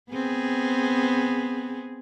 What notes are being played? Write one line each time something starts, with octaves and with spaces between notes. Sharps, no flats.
B3 C4 G#4